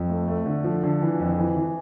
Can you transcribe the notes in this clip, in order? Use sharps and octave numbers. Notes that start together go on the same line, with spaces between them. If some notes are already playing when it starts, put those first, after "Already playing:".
Already playing: F2
A3
A3
D3
F3
D3
E3
F2
E3
E3